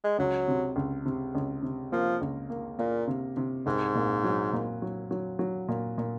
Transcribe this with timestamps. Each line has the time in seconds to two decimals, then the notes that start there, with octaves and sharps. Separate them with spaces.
0.04 G#3
0.18 C#2 F#3
0.48 C3
0.76 C#2
1.06 C3
1.35 C#2
1.63 C3
1.92 F3 A#3
2.21 C#2
2.50 A#3
2.79 A#2 A#3
3.08 C3
3.37 C3
3.66 C2 G#2
3.95 A#2
4.24 F#3
4.53 A#2
4.82 F#3
5.11 F#3
5.39 F#3
5.69 A#2
5.98 A#2